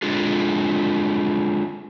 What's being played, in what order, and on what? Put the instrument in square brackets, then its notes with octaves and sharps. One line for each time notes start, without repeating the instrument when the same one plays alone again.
[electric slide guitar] G#3 D4 F4 G#4